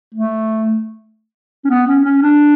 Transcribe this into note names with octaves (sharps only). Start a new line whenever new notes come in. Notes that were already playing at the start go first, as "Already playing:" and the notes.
A3
C#4
B3
C#4
C#4
D4